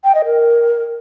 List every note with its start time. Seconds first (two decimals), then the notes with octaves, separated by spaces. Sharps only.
0.04 G5
0.15 D#5
0.25 A#4